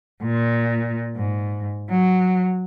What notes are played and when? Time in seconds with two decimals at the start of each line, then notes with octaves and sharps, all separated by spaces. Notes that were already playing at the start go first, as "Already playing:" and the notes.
0.23 A#2
1.15 G#2
1.89 F#3